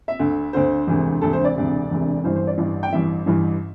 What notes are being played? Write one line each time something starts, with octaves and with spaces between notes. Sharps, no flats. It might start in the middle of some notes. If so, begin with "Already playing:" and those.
E5
D2 D3
D2 D3 C5
E1 D2 C3
E1 D2 C3 A4
C5
D5
E1 D2 C3
E1 D2 C3
A1 G2 E3 C5
C5
D5
A1 G2 E3
G5
A1 G2 E3 E5
A1 G2 E3